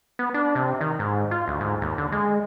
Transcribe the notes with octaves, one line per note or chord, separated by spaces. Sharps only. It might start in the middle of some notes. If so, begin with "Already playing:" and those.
B3
D4
C3
D#3
G#2
F4
D2
G#2
D#2
D3
G#3